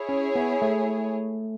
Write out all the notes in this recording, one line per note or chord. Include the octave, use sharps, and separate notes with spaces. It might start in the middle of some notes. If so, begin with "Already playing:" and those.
Already playing: E4 G#4 C#5
C#4
B3
A3